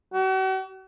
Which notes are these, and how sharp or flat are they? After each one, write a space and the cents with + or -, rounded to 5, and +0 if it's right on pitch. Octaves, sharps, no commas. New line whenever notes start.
F#4 +45